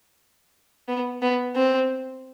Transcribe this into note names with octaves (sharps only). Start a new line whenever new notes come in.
B3
B3
C4